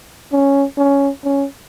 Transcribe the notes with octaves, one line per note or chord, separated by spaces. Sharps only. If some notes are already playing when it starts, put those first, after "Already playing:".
C#4
C#4
C#4